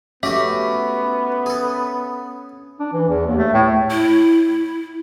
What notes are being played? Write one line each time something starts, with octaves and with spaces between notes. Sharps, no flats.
A3 B3 C#4 F#4 G4 E5
G#4 A4
D4
E3
E2
D#2
A3
A2
E4